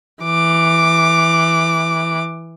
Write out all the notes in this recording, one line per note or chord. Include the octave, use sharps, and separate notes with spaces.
E3 D6